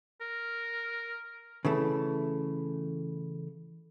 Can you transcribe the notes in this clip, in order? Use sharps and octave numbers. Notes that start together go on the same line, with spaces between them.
A#4
C#3 E3 A3